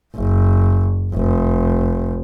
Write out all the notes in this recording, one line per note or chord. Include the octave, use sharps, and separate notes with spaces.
F#1
F1